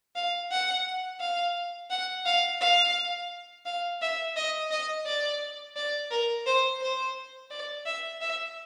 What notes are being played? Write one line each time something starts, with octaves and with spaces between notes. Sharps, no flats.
F5
F#5
F5
F#5
F5
F5
F5
E5
D#5
D#5
D5
D5
A#4
C5
C5
D5
E5
E5